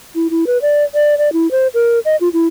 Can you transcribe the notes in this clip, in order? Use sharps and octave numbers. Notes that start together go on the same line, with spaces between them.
E4
E4
B4
D5
D5
D5
E4
C5
A#4
D#5
F4
E4